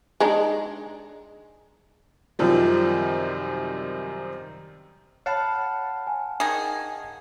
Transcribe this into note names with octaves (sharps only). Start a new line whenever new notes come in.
G#3 D4 D#4
F#2 C3 D#3 F3 G3
C#5 F5 F#5 A5 B5
G#5
D#3 G#4